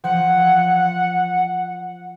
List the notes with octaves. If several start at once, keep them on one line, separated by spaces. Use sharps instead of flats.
F3 F#5